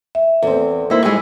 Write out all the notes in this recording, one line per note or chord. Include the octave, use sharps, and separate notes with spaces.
E5
E2 C4 A4
A#3 D#4 E4 C5
G3 G#3 E4 G#4 C#5